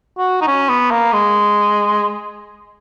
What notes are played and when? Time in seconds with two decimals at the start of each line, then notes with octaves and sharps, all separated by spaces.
0.18 F#4
0.42 D#4
0.47 C#4
0.69 B3
0.91 A#3
1.13 G#3